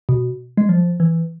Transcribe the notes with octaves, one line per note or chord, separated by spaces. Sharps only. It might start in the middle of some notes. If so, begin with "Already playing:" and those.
B2
G#3
F3
E3